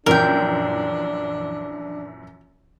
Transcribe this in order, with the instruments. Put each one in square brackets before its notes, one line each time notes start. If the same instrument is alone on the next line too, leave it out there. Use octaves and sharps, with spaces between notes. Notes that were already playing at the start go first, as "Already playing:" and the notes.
[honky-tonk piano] A#1 F#2 E3 [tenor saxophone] D4 [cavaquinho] A#4 G5